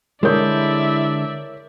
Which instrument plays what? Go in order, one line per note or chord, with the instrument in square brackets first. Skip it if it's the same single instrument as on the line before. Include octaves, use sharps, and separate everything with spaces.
[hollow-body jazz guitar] D3 G#3 [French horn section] E4 [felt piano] A#4 C#5 G6 [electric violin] D5 E5